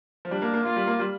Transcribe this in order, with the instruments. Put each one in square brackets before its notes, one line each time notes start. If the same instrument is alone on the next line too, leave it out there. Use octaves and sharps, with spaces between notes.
[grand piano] F3
[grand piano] G3 [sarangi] D4
[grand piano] A#3
A#3
[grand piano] A#3 [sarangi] F4
[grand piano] G3
A#3
G3